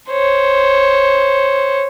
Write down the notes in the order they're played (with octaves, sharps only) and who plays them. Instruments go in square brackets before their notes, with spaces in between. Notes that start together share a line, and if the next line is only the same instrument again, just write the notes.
[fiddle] C5 C#5